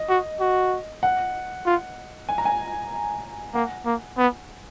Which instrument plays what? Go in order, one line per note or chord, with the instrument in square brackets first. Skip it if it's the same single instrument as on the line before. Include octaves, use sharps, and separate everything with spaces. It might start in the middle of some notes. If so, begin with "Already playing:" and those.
Already playing: [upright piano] D#5
[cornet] F#4
F#4
[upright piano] F#5
[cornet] F4
[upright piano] G#5
A#5
G#5
[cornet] A#3 [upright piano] F#5
[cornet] A#3
B3